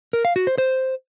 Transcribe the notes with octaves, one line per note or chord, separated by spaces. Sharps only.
A#4
F5
F#4
C5
C5